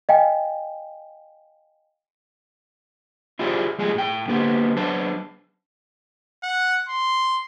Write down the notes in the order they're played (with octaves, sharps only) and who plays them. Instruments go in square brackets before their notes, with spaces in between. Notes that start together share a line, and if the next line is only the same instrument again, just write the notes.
[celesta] D#5 F5 G5 G#5
[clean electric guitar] E4 F4 G4 G#4 C5 D5
F3 G3 G#3 F4 G#4
A2 G5
D3 A#3 B3 G4 C5
F#3 B3 D4 C5 A5
[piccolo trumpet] F#5
C6